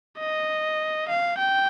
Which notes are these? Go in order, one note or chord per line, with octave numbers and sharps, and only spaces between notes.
D#5
F5
G5